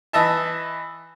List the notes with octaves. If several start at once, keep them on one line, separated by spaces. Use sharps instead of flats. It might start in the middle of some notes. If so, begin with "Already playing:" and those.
E3 D#5 E5 A5